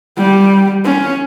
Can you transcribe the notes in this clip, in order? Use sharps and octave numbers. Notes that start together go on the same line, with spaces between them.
G3
C#4